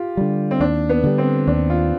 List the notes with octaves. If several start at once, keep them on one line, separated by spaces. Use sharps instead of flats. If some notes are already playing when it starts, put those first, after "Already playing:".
Already playing: F4 G4
D3 G3
C4
D#2 D4
B3
D3 G3
C4
D#2 D4
F4